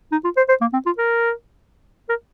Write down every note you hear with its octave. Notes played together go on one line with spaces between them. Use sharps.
D#4
F4
C5
C5
A#3
C4
F4
A#4
A#4